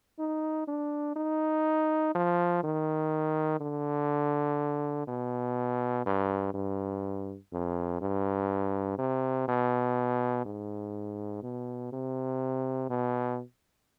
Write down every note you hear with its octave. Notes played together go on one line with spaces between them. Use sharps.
D#4
D4
D#4
F3
D#3
D3
B2
G2
G2
F2
G2
C3
B2
G#2
B2
C3
B2